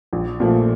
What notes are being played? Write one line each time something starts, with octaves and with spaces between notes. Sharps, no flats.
A#1
A#2 F3 A3